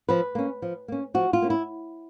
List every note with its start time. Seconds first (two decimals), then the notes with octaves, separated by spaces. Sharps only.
0.09 F3 B4
0.35 A#3 C#4
0.62 F3
0.88 A#3 C#4
1.14 F3 F#4
1.33 F4
1.42 A#3 C#4
1.50 E4